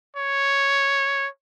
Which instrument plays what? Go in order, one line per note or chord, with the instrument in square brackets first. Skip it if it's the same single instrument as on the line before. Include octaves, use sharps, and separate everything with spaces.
[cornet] C#5